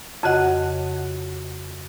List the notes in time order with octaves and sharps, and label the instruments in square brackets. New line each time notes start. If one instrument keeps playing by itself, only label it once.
[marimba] F2 C#3 F#4 D#5 F#5